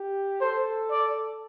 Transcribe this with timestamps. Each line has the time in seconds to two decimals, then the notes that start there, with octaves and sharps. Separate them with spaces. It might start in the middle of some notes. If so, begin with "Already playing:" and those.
Already playing: G4
0.41 A4 C5
0.91 D5